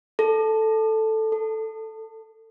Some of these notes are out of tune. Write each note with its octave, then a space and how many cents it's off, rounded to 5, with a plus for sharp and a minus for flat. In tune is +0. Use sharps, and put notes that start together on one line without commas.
A4 +0
A4 +20